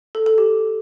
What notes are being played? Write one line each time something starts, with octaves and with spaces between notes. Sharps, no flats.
A4
A4
G4